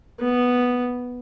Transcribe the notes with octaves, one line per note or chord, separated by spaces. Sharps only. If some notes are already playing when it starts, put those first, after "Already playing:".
B3